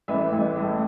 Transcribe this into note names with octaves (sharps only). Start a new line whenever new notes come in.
A1 B4 E5
A1
A2